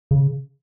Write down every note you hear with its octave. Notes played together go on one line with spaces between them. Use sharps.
C#3